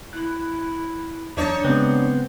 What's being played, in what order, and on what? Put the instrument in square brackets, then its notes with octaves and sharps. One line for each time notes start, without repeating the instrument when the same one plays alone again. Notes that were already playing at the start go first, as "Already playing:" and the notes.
[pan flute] E4 [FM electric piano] F#6
[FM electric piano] E2 A6 [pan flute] F#3 [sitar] D4 D#4 C#5
[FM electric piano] C#3 G#3 [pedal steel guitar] B3 C4